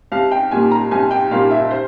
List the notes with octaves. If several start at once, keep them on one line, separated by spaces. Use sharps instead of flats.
C2 F5
G5
A#2 G3 A#3 G#5
A#5
C2 G#5
G5
A#2 G3 A#3 F5
E5
C5